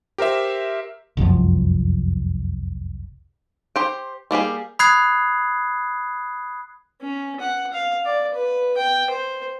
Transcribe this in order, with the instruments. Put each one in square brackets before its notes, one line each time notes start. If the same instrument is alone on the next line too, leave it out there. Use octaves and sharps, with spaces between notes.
[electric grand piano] G4 A#4 C5 E5
[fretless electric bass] F1 C2 F#2 F3
[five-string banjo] G4 C5 G5
G3 A#3 G4 G#4
[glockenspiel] B5 D#6 F#6 G#6 C7
[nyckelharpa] C#4
F#5
F5
D5
B4
G5
C5